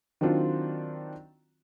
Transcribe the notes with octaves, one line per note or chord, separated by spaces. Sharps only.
D#3 F#3 C4 D4 F4 F#4